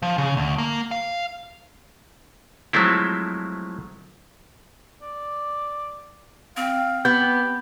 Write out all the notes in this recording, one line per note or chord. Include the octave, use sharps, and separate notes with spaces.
F3
C#3
D2
A#3
F5
F3 F#3 G#3 A3 C4 E4
D5
C4 F5
B3 G4 G6